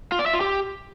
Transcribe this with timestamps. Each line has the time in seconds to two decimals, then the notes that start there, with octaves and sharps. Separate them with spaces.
0.12 F4
0.19 D5
0.26 E5
0.34 F4
0.41 G4